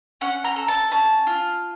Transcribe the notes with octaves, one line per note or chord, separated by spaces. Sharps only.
C#4 F#5
A#5
A4
A5
C#4 A5
F4